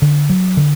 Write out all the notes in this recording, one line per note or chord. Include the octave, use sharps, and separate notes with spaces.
D3
F#3
D3